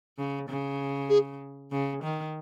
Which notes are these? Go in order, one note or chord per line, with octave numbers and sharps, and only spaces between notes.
C#3
C#3
G#4
C#3
D#3